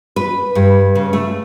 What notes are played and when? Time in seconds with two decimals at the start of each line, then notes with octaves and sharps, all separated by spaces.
0.16 B4
0.55 G2
0.95 C#3
1.13 A3